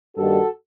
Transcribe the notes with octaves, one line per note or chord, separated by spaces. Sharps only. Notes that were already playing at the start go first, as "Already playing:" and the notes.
G2 D#3 G3 A#3 F#4 A4